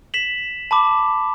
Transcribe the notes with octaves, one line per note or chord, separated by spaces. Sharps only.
B6 E7 F#7
A5 B5 D6